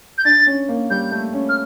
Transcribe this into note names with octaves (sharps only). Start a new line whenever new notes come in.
G6
D4 A6
C#4
A#3
G3 G6
A3
C#4
F6